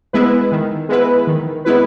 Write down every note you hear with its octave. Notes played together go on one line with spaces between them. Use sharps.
G#3 B3 E4 B4
D#3
G#3 B3 E4 B4
D#3
G#3 B3 E4 B4